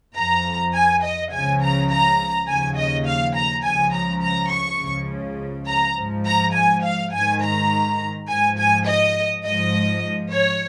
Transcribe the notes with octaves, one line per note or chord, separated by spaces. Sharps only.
F2 F3 A#5
G#5
D#5
C#2 C#3 F3 G#5
A#5
A#5
D#2 C#3 F3 G#5
D#5
F5
A#5
C#2 C#3 F3 G#5
A#5
A#5
C#6
C#2 C#3 F3
A#5
G#2 F3
A#5
G#5
F5
G#2 D#3 G#5
A#5
G#2 F3 G#5
G#5
D#5
G#2 F3 D#5
C#5